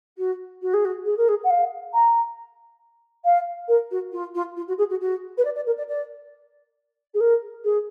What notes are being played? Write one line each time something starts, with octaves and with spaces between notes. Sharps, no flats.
F#4
F#4
G#4
F#4
G#4
A#4
G#4
F#5
F5
A#5
F5
A#4
F#4
F4
F4
F4
F#4
G#4
F#4
F#4
B4
D5
D5
A#4
D5
D5
G#4
A#4
G#4